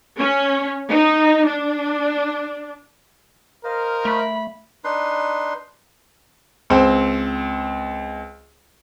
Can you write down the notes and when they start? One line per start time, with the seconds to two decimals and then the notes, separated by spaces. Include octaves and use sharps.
0.19 C#4
0.89 D#4
1.46 D4
3.64 A#4 C5 D#5 F5
4.05 A3 B5
4.84 D4 D#4 B4 C6
6.70 C#2 C4 C5